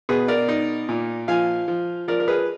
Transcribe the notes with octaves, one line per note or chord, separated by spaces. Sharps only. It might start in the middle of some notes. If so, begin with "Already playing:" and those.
B2 G#4 B4
A#4 D5
D#4
A#2
F3 F5 G#5
F3
F3 A#4 D5
A#4
G#4 B4